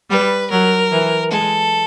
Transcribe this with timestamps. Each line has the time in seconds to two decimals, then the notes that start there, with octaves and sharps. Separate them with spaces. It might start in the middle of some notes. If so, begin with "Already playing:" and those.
0.10 G3 B4
0.50 F#3 A#4
0.91 E3
1.31 G#3 A4